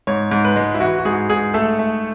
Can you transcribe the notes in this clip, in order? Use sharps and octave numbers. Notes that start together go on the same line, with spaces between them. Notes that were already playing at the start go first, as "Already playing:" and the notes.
G#2 C#5
G#2
B4
G#3
E4
E3 F#4
F#4
G#2 G#4
G#2 G#4
A3 A4
A3